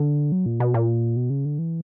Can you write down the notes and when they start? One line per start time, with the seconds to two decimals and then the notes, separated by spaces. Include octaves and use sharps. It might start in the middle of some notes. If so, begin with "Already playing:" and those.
Already playing: D3
0.32 F#3
0.46 A#2
0.60 B2
0.74 A#2
1.16 B2
1.30 C#3
1.45 D3
1.59 E3